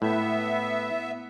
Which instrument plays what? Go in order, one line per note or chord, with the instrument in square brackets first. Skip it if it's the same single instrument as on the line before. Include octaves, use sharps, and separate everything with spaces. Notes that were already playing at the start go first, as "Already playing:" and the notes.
[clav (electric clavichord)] A2 [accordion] B3 E5